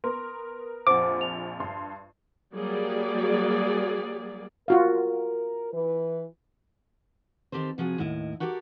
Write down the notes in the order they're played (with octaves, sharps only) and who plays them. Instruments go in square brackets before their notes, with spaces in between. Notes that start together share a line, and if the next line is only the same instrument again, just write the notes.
[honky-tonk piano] B3 A#4 [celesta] C6
[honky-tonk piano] A#1 F2 [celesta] C5 F#5 [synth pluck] D6
[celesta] F7
[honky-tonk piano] G2 C6
[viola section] F#3 G3 A#3 F#4 G#4 D5
[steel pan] F4 F#4 F5 [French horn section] A#4
[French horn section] E3 B4
[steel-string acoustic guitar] D#3 C4 G4 A4 C5
C3 F3 F#4 G#4
D#2 A2 E4 D#5
F#4 G4 A4 A#4 C5 D5